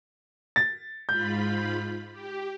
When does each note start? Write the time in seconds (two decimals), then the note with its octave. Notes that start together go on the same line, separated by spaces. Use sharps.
0.56 A6
1.09 G#2 F4 B5 G6
2.12 G4